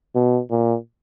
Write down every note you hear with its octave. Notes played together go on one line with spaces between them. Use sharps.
B2
A#2